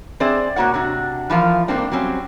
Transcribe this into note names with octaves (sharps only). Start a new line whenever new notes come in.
C4 G#4 C5 D5 E5
A#2 A#3 F#4 C#5 F#5
C3 D4 F#4
E3 F3 A#4 F5
G#2 A3 A#3 C4 D4
F#3 G3 C4 C#4